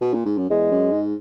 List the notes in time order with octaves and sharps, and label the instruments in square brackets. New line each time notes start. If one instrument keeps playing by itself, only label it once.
[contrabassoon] B2
A#2
G#2
F#2
[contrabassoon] E2 [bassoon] G#3
[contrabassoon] F#2
G#2